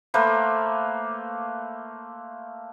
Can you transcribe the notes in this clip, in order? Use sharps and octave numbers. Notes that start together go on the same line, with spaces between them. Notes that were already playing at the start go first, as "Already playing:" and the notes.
A3 A#3 B4 C5